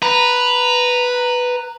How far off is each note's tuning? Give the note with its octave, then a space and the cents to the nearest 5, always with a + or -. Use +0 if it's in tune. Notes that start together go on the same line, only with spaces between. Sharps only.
B4 +0 A#5 -5